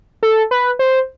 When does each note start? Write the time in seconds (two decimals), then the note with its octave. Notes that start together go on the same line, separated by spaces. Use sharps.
0.23 A4
0.51 B4
0.79 C5